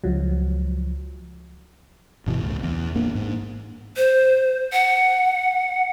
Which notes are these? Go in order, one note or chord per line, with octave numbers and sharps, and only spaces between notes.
C#2 F3 F#3
G1 B2 E3
C#2 A2
E2
A1 A#3 D4
G#2
C5
F#5